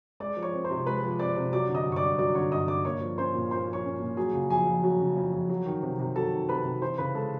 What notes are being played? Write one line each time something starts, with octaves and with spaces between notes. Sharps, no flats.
G#3 D5 D6
F3
C#5 C#6
C4
C5 C6
C3
G#3 B4 B5
F3
C4 D5 D6
C3
F#3 D5 D6
D3
D#5 D#6
G2
C#6
D5 D6
G2
F#3 D5 D6
D3 C#5 C#6
G2 D#5 D#6
G2 D5 D6
A#3 C#5 C#6
F3
C#4 C5 C6
A#2
A#3 C5 C6
F3
C#5 C#6
C#4
A#2
F#3 G#4 G#5
C#3
F2 G#4 G#5
F2
F#3
C#3
F2
F2
F#3
D#3
C3
C3
F#3 A4 A5
D#3
C3 B4 B5
C3
E3 C5 C6
C#3 B4 B5
G#3 A4 A5